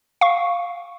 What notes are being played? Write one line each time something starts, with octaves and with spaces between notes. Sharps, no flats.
F5 C#6